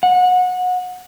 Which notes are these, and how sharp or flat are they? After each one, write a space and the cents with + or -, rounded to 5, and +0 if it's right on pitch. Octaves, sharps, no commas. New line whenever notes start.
F#5 -25